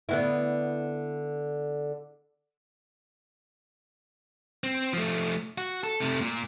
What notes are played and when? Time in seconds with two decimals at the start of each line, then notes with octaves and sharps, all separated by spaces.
0.09 D3 B3 E4
4.64 C4
4.93 F3 A3
5.58 F#4
5.83 A4
6.00 C3 A3
6.21 A#2